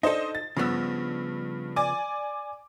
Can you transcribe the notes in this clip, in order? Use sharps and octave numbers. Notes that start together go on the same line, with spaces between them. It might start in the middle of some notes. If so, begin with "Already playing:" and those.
D4 D#4 A4 C5 D#5
A6
G2 C#3 F3 B3 E6
D5 G#5 D6